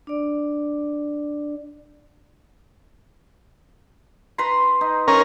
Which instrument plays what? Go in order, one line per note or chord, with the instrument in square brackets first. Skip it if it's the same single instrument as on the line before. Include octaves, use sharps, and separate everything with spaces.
[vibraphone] D4 D5
[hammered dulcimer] B4 A#5 C6
D#4
[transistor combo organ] C#4 A#4